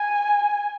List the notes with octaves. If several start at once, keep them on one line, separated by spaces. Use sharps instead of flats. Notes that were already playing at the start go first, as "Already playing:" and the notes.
Already playing: G#5